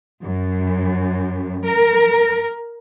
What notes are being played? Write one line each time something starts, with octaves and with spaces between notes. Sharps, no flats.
F#2
A#4